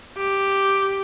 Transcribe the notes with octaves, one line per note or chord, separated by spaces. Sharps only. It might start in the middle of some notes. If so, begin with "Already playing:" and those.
G4